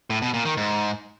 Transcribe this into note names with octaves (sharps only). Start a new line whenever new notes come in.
A2
B2
A#2
D#3
G#2